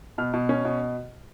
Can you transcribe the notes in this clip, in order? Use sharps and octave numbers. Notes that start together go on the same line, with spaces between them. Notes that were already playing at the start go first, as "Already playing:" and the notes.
B2 F6
B2
C#4
B2